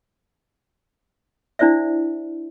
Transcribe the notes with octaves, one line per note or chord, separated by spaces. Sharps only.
D4 E4 C5 D5 E5